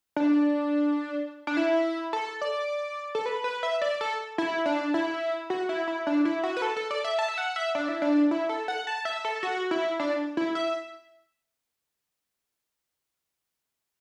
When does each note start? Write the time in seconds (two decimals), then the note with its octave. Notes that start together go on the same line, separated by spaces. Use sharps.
0.16 D4
1.47 D4
1.57 E4
2.13 A4
2.42 D5
3.15 A4
3.26 B4
3.44 B4
3.63 E5
3.82 D5
4.01 A4
4.38 E4
4.66 D4
4.94 E4
5.50 F#4
5.69 E4
5.88 E4
6.07 D4
6.25 E4
6.43 F#4
6.57 B4
6.62 A4
6.77 A4
6.91 D5
7.04 E5
7.19 A5
7.28 E5
7.38 F#5
7.56 E5
7.75 D4
7.88 E4
8.02 D4
8.31 E4
8.49 A4
8.68 F#5
8.87 A5
9.05 E5
9.25 A4
9.43 F#4
9.71 E4
10.00 D4
10.37 E4
10.55 E5